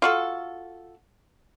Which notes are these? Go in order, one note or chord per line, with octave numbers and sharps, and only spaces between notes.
F4 F#4 A4